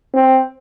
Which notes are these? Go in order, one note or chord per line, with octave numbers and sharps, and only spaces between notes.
C4